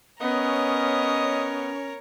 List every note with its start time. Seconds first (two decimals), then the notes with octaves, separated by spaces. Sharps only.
0.21 B3 C#4 A#4 C#5 D#5